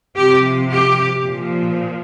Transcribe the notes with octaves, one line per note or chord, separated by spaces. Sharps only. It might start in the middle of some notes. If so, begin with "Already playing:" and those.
C3 F3 G4
G4
A#2 F3